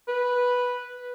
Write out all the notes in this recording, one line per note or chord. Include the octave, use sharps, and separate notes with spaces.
B4